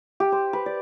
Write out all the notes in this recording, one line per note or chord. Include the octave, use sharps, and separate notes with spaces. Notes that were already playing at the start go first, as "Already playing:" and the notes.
G4
C5
B4
D5